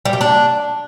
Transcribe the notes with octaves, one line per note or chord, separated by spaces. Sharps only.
G3
G4
D4